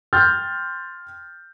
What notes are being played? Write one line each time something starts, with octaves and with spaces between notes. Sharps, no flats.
G5 C6 F6 G6 A6